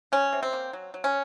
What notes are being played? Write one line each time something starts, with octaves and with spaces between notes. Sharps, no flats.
F#3 C#4
C3
C4
A#3
F#3
F#3
C#4